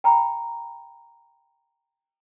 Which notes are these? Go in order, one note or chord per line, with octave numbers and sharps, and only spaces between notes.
G5 A#5 B5